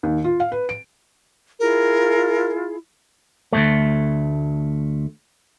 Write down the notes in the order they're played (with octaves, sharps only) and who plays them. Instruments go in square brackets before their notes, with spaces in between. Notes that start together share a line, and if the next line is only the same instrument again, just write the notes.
[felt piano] D#2
F4
F5
B4
D7
[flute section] E4 F4 G#4 [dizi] A#4
[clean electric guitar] D2 G#2 A3